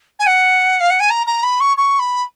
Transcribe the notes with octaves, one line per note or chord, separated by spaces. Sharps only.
G#5
F#5
F5
F#5
G#5
A#5
A#5
B5
C#6
C#6
B5